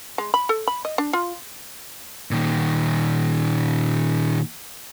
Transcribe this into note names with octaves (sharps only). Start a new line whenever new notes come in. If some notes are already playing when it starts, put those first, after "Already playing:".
G#3
B5
A4
B5
D#5
D4
F4
A#2 D#3